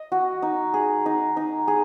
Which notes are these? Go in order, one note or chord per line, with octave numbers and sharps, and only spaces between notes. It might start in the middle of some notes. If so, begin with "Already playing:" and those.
Already playing: D#5
F#4
D#4
G#4
D#4
D#4
G#4